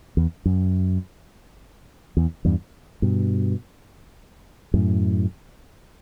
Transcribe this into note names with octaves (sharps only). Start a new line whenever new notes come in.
E2
F#2
E2
E2 G2
G2 B2
F#2 A2